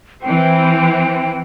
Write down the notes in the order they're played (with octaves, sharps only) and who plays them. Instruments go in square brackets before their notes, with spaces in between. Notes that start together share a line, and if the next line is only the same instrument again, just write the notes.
[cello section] E3 C4 [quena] G5